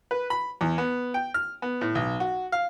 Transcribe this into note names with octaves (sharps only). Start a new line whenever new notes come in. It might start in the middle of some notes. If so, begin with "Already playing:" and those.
B4
B5
E2
B3
G5
F6
B3
A2
B1
F#4
F5